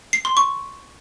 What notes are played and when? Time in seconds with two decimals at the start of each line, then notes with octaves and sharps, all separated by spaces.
0.13 C7
0.25 C6
0.37 C#6